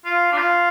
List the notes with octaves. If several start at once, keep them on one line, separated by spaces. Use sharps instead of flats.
F4
D4
F4